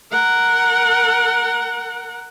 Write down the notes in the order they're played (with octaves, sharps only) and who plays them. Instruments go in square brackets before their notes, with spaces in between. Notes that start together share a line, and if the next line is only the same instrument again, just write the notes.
[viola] A#4 F#5